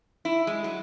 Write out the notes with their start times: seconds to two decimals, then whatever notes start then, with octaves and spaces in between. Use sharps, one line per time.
0.25 E4
0.47 G#3
0.64 F#3